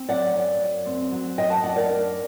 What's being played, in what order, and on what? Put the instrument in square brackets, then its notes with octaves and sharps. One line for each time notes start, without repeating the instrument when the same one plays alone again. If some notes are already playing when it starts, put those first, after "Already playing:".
Already playing: [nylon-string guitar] C4
F#3 D5 F#5
F#2
F#2
C4
F#3
F#2 D#5 G5
F#5 A5
F#2 D5 F#5
A#4 D5
D4